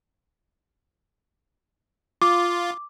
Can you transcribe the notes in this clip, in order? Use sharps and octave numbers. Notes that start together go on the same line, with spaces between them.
F4 D6